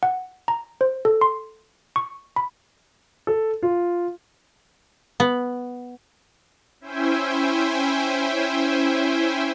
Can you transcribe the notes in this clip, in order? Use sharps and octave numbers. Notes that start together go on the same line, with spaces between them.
F#5
A#5
C5
A4
C6
C#6
B5
A4
F4
B3
C#4 E4 C5 E5 G5 G#5